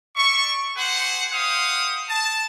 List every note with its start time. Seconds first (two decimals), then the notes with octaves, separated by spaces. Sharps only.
0.16 D5 E5 C#6
0.77 G4 G#4 C5 F#5
1.32 G4 C5 F5 F#5 D#6
2.09 A5